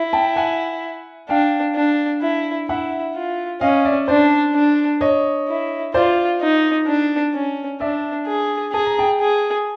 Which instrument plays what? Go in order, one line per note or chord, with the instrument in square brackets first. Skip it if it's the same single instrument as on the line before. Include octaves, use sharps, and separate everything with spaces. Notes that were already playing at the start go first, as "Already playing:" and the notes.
Already playing: [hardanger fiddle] E4
[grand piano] G5 A5
F#5 G#5
[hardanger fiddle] D4 [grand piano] F5 G5
[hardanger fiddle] D4
E4
[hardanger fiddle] E4 [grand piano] E5 F#5
[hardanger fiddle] F4
[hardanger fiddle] C#4 [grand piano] D#5 F5
[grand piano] D5 E5
[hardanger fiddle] D4 [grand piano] C5 D5
[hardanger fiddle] D4
[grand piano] C#5 D#5
[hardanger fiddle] E4
[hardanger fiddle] F4 [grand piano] C5 D5
[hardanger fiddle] D#4
D4
C#4
[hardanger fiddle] D4 [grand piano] D5 E5
[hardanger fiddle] G#4
[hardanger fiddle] G#4 [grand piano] A5
[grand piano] A#5
G5 A5
[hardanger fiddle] G#4